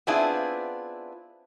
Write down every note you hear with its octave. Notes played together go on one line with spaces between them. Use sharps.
B3 C4 D4 E4 F4 G#4